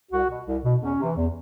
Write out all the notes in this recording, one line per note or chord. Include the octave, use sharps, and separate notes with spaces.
C2 F#4
B2
C2
B2
E2 C#4
C3 E3
E2